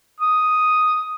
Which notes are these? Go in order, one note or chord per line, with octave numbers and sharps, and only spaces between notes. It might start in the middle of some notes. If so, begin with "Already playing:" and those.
D#6